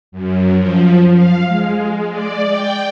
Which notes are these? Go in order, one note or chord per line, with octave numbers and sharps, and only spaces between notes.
F#2
F3
F5
G#3
D5
G5